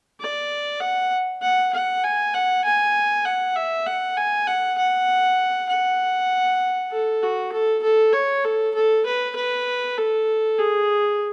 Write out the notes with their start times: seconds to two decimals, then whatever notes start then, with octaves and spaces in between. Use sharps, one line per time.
0.20 D5
0.81 F#5
1.42 F#5
1.73 F#5
2.04 G#5
2.34 F#5
2.64 G#5
3.25 F#5
3.56 E5
3.86 F#5
4.17 G#5
4.47 F#5
4.78 F#5
5.69 F#5
6.91 A4
7.23 F#4
7.53 A4
7.83 A4
8.13 C#5
8.44 A4
8.75 A4
9.06 B4
9.36 B4
9.98 A4
10.58 G#4